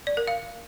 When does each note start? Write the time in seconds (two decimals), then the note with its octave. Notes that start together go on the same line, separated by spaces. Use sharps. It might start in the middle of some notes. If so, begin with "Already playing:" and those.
0.07 D5
0.17 A#4
0.27 F5